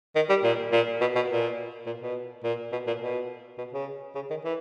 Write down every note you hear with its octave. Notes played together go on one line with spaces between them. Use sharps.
D#3
G3
A#2
A#2
B2
B2
A#2
A#2
B2
A#2
B2
A#2
B2
B2
C#3
C#3
D#3
E3